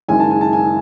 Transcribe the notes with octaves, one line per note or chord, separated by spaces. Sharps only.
F#1 F#2 D#3 G#3 G#5
A5
G#5
A5
G#5